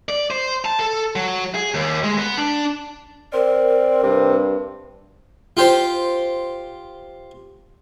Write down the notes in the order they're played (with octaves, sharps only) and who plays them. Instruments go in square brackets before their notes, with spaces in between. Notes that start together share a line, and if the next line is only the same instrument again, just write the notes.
[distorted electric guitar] D5
C5
A5
A4
F#3
G#4
D#2
G#3
B3
D4
[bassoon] C4 [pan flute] A#4 [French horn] D5
[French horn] G2 [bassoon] C3
[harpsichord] F4 G4 C5